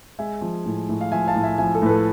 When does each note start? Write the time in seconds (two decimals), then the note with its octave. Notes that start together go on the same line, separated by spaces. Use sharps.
0.19 G#3 E5 G#5
0.41 F3
0.66 A2
0.89 A2
1.01 F5
1.12 F3 E5 G#5
1.27 F5 A5
1.35 A2
1.44 E5 G#5
1.58 F3 E5 G#5
1.75 A4
1.82 A2 B4
1.90 A4